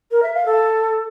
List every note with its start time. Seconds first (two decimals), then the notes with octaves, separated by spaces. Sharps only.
0.11 A#4
0.22 E5
0.34 F5
0.45 A4